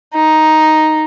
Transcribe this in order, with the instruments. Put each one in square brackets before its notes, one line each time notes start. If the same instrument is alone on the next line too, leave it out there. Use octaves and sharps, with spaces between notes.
[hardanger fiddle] D#4